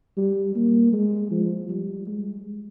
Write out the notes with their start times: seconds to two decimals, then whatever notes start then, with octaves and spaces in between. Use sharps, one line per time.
0.17 G3
0.55 A#3
0.93 G#3
1.31 F3
1.69 G3
2.07 G#3